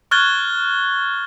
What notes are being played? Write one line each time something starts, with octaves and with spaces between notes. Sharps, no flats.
C#6 F6 F#6 G#6 A6 G7